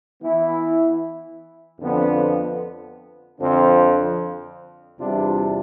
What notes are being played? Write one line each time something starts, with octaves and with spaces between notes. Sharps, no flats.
E3 B3 E4
F2 D3 F3 B3
F2 D3 F3 C4
E2 C3 G3 D4 F4